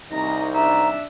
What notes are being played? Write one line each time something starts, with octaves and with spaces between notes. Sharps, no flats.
C2 D#4 A#5
D4 E5 A#5